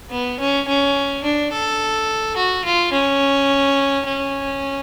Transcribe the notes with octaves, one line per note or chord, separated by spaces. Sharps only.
B3
C#4
C#4
D4
A4
F#4
F4
C#4
C#4